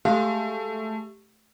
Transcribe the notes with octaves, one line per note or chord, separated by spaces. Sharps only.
G#3 A3 G4 F5